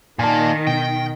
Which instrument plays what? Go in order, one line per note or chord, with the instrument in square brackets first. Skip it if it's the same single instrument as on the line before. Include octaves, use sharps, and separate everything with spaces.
[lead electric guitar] A#2 A#3 [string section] D#3 [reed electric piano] G#5 A5
[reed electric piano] B2 [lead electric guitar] G5